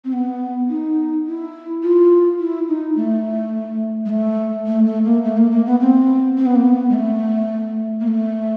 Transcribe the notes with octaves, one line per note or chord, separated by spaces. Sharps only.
C4
B3
D#4
E4
F4
E4
D#4
A3
G#3
A3
A3
A3
A#3
A3
A#3
A#3
B3
C4
C4
B3
A#3
B3
G#3
A3
A#3
A3